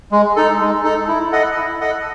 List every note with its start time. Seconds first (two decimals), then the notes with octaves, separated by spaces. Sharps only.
0.12 G#3
0.36 D#4 A4
0.60 G#3
0.84 D#4 A4
1.08 E4
1.32 A4 D#5 F#5
1.56 E4
1.81 A4 D#5 F#5